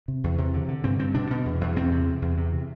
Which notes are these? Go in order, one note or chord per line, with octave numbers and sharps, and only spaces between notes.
C3
E2
C3
D3
D3
G2 C4
G2 C4
B2 D4
B2
E2
E2
E2 C4
C3
C3
E2
C3
C3